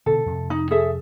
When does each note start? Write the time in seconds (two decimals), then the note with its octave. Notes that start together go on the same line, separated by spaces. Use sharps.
0.06 B2 D3 E3 A4
0.26 F2 C3
0.50 D#4
0.71 G#4 A4 E5